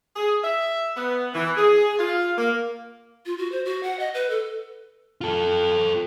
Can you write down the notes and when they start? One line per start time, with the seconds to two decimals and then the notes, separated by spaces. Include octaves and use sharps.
0.16 G#4
0.44 E5
0.96 B3
1.34 E3
1.57 G#4
1.99 F4
2.38 A#3
3.26 F4
3.38 F#4
3.52 C5
3.66 F#4
3.83 F#5
3.99 D#5
4.14 B4
4.30 A4
5.21 F4 A4